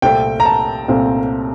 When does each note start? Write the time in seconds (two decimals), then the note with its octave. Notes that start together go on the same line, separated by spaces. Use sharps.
0.02 C2 A#2 A3 C4 G5
0.40 A#5
0.45 A5
0.88 C2 A#2 A3 C4